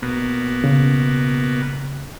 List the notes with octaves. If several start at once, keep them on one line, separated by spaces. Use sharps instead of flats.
B2 A#3 B3
C#3